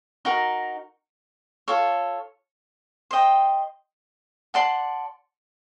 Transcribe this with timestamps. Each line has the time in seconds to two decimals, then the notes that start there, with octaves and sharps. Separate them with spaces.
0.25 D#4 F#4 A#4
1.68 F4 A4 C#5
3.11 C5 D#5 G5
4.54 D5 F#5 A5 C6